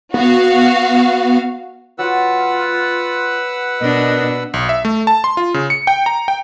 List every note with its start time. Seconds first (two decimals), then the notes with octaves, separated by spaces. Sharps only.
0.14 B3 F#4 F5
1.99 F#3 F4 B4 F#5 E6
3.80 B2 D4 A#4 D#5
4.54 B1
4.69 E5
4.85 A3
5.07 A5
5.24 C6
5.37 F4
5.54 C#3
5.70 C#7
5.87 G5
6.06 A#5
6.28 G5